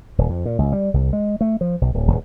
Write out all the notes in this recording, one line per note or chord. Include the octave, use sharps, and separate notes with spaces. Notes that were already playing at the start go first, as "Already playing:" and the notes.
D#1
F2
A#2
C#2
G3
C2
G#3
A3
F3
B1
D1
D1